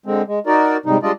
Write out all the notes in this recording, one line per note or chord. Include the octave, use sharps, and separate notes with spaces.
D3 G#3 C4
G#3
D#4 F#4 A#4 D5
G#2 C3 G3 D#4
G3 G#3 D4 F4 D5 D#5